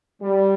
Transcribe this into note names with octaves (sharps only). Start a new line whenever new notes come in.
G3